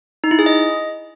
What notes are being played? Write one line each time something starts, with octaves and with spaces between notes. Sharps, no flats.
D#4
E4
G#4
D#5